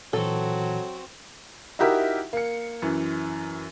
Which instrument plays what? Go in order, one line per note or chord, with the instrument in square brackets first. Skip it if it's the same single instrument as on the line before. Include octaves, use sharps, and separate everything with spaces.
[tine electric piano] A#2 E3 [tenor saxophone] F#3 [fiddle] C4 F#4 [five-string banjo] A4
[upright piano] D#4 E4 F#4 G4 A#4 E5
A#3 C#7
F#2 E3